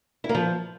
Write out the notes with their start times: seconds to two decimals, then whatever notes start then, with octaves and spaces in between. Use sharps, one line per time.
0.24 E4
0.29 A#3
0.35 F3